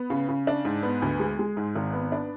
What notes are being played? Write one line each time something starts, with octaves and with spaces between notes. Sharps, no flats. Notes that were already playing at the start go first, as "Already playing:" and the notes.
Already playing: B3
C#3
C#3
D4
G#2
B3
D2
G#3
G#3
G#2
G#1
B3
D4